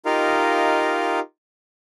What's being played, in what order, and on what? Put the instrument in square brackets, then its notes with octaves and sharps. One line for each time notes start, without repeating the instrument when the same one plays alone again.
[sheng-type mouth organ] D#4 F4 G4 A#4 D#5 F5